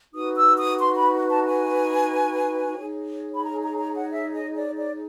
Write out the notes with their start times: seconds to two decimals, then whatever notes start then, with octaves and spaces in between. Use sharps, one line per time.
0.14 D#4 F#4 B4 D#6
0.36 E6
0.58 D#6
0.79 C6
0.97 B5
1.29 A5
1.46 G#5
2.78 D#4 G#4 C#5
3.34 B5
3.44 A#5
3.62 A#5
3.78 A#5
3.95 F#5
4.11 E5
4.33 D#5
4.55 D5
4.76 D5